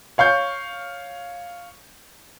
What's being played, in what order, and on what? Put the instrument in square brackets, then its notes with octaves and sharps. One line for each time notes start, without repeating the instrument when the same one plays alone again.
[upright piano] C#5 F5 C#6 G6